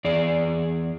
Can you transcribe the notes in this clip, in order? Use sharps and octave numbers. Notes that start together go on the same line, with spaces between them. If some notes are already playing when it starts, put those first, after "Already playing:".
E2 G#4 D5